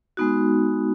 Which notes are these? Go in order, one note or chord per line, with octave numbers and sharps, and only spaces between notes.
G#3 B3 D#4 F#4